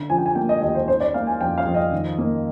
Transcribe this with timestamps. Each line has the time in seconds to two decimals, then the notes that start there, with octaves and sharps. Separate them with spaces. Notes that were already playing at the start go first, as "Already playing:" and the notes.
Already playing: D3
0.09 F3 G#5
0.18 G5
0.26 G#5
0.35 A#3 G5
0.49 D#5
0.62 D#2 D#5
0.75 C5
0.88 D#3 C5
1.00 D5
1.14 A#3 F5
1.27 G#5
1.41 F2 G5
1.58 F5
1.66 F2
1.74 D#5
1.92 D#3
2.18 A#3